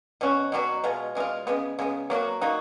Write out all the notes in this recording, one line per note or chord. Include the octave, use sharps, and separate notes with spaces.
B2 F#3 C#4 F#4
B2 F#3 C#4 F#4
B2 G#3 B3 F4
B2 G#3 B3 F4
C#3 G#3 B3
C#3 G#3 B3
F#3 A#3 D#4 F#4
F#3 A#3 D#4 F#4